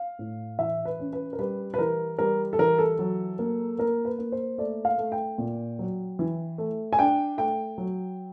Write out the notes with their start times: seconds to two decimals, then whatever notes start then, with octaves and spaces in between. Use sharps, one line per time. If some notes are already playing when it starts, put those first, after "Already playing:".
Already playing: F5
0.19 A2
0.59 E3 E5
0.85 B4
0.99 C#4
1.13 B4
1.33 A#4
1.39 G3 B4
1.74 B4
1.79 E3 A#4
2.18 G3 A#4
2.53 A4
2.59 E3 A#4
2.78 A4
2.99 F#3
3.39 A#3
3.79 A#3 A#4
4.05 B4
4.18 A#3
4.32 C5
4.58 A3 D5
4.85 F5
4.98 A3
5.12 G5
5.38 A#2
5.79 F#3
6.19 E3
6.58 A3
6.93 G#5
6.98 D4 G5
7.38 A3 G5
7.78 F#3